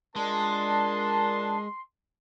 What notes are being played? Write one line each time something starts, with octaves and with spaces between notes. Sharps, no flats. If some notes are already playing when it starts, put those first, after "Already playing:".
G#3 D4 F4 A#4 A5 C6